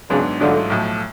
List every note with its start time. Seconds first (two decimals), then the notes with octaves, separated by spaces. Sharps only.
0.10 G#1 G#2 C#3 F#3 B3 D4
0.40 A1 G#2 D3 F#3 A3 F4
0.70 B1 A2 F3